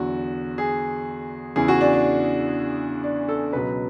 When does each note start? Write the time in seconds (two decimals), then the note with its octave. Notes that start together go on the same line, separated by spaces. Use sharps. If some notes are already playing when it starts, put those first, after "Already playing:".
Already playing: E2 D3 F#3 F#4
0.58 G#4
1.56 E2 C#3 E3 G#4
1.68 F#4
1.81 D4
1.93 D4
3.04 D4
3.29 A4
3.53 C#2 B2 F#3 B4